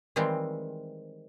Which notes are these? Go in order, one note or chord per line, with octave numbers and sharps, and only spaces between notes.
D#3 E3 G3 G#3 C4